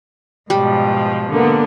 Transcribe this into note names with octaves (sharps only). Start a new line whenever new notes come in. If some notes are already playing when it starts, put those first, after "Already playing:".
G#2 B2 F3 G3
D3 A#3 B3